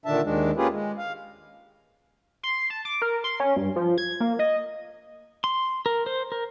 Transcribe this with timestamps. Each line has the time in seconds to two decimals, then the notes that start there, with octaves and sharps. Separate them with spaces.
0.06 A#2 D3 D#3 D4 E5 A5
0.23 D#2 D#3 G#3 D4
0.57 A#3 C#4 F4 G4 G#4 B4
0.71 G#3
0.98 F5
2.43 C6
2.70 A5
2.85 D6
3.02 A#4
3.24 C6
3.40 C#4
3.56 G2
3.76 F3
3.98 G#6
4.20 A#3
4.39 D#5
5.44 C6
5.86 A#4
6.06 C5
6.32 A#4